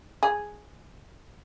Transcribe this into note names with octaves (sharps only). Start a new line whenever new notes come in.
G#4